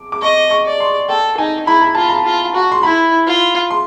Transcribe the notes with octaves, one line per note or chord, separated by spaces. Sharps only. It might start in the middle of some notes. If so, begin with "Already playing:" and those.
Already playing: D6
D6
D#5 C#6
C#6
D5
C6
A4 G5
D#4 G#5
E4 B5
A#5
F4 A5
A#5
F4
F#4
C6
E4 B5
F4
C6